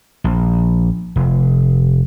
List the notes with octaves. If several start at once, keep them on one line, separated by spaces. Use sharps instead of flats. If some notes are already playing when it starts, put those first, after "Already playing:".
A#1
F1